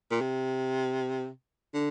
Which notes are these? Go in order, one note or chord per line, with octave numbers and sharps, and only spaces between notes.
A#2
C3
D3